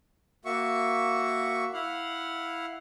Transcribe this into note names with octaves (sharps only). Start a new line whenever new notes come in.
A#3 F#4 E5 C#6
E4 F5 F#5